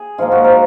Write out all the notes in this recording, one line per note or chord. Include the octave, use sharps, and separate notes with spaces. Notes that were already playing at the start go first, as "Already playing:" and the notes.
Already playing: G#4
G#2 F3 A#3 F4
F#4
A#4